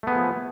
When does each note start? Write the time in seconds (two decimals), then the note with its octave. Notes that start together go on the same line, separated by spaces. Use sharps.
0.03 A3
0.07 B3
0.11 G#4
0.15 F3